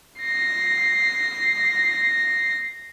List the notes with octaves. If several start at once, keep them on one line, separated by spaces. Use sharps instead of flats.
A#6 C7